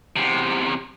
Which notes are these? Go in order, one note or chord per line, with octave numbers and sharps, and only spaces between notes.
E2 C3